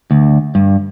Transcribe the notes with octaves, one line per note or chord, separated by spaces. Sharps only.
D2
G2